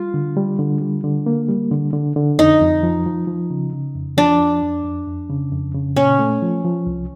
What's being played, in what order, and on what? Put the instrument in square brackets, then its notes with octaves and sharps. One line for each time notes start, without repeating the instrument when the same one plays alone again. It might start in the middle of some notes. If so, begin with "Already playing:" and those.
Already playing: [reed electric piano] G3 [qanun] F4
[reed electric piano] D3
G3
D3
G3
D3
A#3
G3
D3
D3
D3
[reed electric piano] F2 [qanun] D#4
[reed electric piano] F2
F3
F3
F3
C#3
C#3
F2
[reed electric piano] F3 [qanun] D4
[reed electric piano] F2
F2
F2
F2
C#3
F2
C#3
[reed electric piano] A#2 [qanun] C#4
[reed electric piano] A3
F3
F3
C2